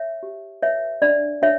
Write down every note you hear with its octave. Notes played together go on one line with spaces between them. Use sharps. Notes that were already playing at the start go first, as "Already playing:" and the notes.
Already playing: C#5 E5
G4
B4 C#5 E5
D4 D5
D4 C#5 E5